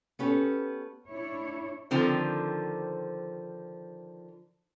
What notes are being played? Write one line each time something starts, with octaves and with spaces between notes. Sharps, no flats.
B3 C#4 G4 A4
D4 E4 C#5
D3 D#3 F3 C4